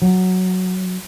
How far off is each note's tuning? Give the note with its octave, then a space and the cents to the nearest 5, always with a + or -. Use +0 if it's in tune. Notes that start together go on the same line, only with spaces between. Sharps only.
F#3 +0